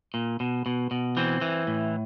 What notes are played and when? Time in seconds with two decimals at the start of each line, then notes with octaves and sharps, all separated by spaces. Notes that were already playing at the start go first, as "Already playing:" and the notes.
0.14 A#2
0.40 B2
0.66 B2
0.91 B2
1.17 E3 C4
1.41 E3
1.67 A2